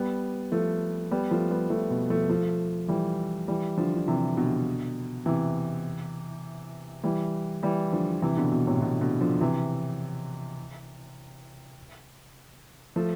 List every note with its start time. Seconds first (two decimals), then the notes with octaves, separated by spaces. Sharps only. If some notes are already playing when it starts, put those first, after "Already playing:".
Already playing: G3 B3
0.52 F3 A3
1.11 G3 B3
1.31 F3 A3
1.50 G3 B3
1.70 F3 A3
1.91 B2
2.10 F3 A3
2.30 F3 A3
2.88 E3 G3
3.48 E3 G3
3.78 D3 F3
3.96 D3
4.08 C3 E3
4.37 B2 D3
5.26 C3 E3
7.04 E3 G3
7.63 E3 G3
7.92 D3 F3
8.22 C3 E3
8.37 B2 D3
8.52 B2
8.67 A2 C3
8.81 B2 D3
9.01 B2 D3
9.21 D3 F3
9.41 C3 E3
12.96 F3 A3